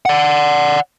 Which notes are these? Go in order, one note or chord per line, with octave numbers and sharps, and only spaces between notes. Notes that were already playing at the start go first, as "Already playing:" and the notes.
D5 F#5